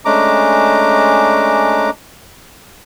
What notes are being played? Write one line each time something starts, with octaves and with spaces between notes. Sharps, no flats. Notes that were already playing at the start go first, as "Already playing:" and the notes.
G#3 A3 C#4 D4 A#5 D6